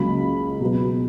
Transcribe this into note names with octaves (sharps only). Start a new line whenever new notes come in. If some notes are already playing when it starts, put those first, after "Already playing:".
Already playing: C#2 C#3 F#3 A#3 B5
B2 F#3 B3